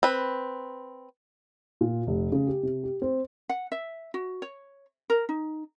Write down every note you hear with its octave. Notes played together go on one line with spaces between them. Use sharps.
C4 B4
A#2
F1
C#3
G4
C3
G4
C4
F#5
E5
F#4
C#5
A#4
D#4